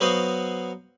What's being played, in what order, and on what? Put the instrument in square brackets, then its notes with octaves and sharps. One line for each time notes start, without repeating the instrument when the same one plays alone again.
[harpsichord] F#3 B3 F#4 C5 D#5 F5